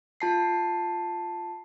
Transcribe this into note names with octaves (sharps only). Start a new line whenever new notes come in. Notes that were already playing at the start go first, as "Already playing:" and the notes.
F4 A5 C7